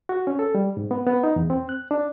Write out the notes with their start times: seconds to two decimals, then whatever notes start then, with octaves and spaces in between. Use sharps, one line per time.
0.09 F#4
0.27 C#4
0.39 A4
0.55 G3
0.77 G#2
0.91 B3
1.06 B3
1.24 D#4
1.36 E2
1.50 C4
1.69 F#6
1.91 D4